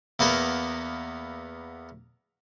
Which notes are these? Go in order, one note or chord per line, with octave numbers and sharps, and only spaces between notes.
E2 A#3 B3 A#4